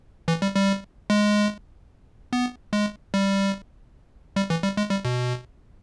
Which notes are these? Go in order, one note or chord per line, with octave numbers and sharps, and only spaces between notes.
E3
G3
G3
G#3
B3
G#3
G3
G3
E3
G3
G#3
G3
B2